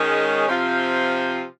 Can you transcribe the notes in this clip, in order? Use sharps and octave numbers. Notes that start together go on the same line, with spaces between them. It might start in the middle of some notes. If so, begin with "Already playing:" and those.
Already playing: D#3 G#3 C#4
C3 F3 C4 F4